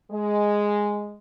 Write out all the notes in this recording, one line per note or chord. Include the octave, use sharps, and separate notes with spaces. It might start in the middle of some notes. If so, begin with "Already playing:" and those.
G#3